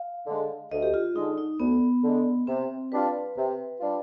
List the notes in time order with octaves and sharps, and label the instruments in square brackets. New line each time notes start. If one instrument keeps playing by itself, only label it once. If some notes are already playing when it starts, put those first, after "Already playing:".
Already playing: [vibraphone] F5
[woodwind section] D3 G#3
[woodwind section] D2 [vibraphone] D#5
[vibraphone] G4
F4
[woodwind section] D3 G#3 [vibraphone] D#4
[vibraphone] D#4
[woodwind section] D2 [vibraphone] B3
[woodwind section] D3 G#3
[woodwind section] C3 [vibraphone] C4
[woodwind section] G3 D4 F4 [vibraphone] B4
[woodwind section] C3
G3 D4 F4